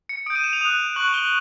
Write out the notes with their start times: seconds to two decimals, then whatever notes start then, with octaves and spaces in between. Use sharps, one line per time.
0.09 C#7
0.26 D#6 G6 D7
0.35 D#7
0.44 E7
0.53 F7
0.61 D#6 F#6
0.96 C#6 F#6 F#7
1.14 G7